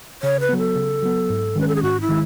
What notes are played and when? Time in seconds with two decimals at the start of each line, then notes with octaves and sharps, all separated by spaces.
0.22 C#3 C#5
0.40 B4
0.49 F#3 B3
0.58 A4
0.75 C#3
1.02 F#3 B3
1.30 G#2
1.55 D#3 G#3 C#4 B4
1.68 A4
1.75 G#4
1.83 G#2 F#4
2.01 E4
2.09 D#3 G#3